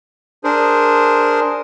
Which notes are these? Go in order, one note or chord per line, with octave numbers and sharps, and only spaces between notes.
D4 G#4 A#4 C5